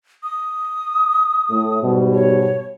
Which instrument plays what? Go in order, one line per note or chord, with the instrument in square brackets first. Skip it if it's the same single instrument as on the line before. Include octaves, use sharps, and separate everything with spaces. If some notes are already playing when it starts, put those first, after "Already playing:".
[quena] D#6
[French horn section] A2 A3
G#2 B2 G3
[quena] C#5